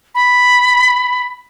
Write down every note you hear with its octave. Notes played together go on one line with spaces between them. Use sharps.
B5